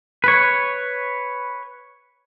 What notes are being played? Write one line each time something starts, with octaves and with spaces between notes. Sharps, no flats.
B4 C#5